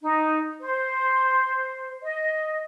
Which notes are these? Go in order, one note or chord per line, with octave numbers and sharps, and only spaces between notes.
D#4
C5
D#5